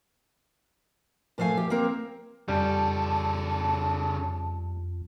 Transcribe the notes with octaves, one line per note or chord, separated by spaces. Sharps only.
A#2 F3 A3 F5 G#5
G4
A#3 C4 A#4
F2 C#3 G3 A4 A5